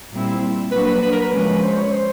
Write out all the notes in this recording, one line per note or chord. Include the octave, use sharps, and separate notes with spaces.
A#2 G3 C4 E4
F#3 A#3 D4 F#4 B4
B4
B4
A#4
B4
C#3 F3 G#3 C#4
C5
C#5
C5